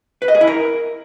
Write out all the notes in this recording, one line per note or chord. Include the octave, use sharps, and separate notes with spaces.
B4
D#5
G#4
E4
A#4